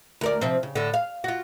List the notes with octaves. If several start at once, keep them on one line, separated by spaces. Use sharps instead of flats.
D2 A#4 D5
C3 F3 C4
C#3
A2 D3
F5
F4 F#4